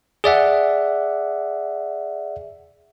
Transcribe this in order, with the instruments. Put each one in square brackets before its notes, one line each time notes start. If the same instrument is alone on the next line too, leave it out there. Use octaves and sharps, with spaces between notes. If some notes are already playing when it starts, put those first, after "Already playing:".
[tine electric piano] G#4 D5 E5 F#5